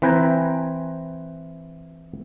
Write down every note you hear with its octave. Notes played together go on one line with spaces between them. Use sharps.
E3 C4 B4 G5 G#5 A#5